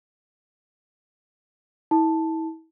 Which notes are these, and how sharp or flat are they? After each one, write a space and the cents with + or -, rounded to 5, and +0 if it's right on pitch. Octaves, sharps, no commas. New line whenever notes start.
E4 -35 A5 +0